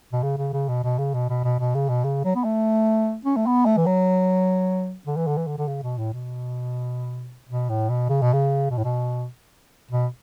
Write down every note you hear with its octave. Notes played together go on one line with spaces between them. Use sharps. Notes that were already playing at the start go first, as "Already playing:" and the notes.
B2
C#3
C#3
C#3
B2
B2
C#3
B2
B2
B2
B2
C#3
B2
C#3
F#3
B3
A3
C#4
A3
B3
A3
E3
F#3
D3
E3
D3
E3
D3
D3
C#3
B2
A2
B2
B2
A2
B2
C#3
B2
C#3
B2
A2
B2
B2